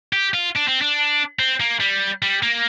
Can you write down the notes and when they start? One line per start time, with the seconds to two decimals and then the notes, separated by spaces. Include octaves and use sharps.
0.13 G4
0.34 F4
0.56 D4
0.68 C4
0.81 D4
1.39 C4
1.60 A#3
1.80 G3
2.23 G3
2.43 A#3